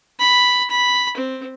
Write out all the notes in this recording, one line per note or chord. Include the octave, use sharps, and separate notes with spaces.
B5
B5
C4